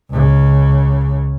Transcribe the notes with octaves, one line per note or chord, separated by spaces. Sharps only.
C#2 C#3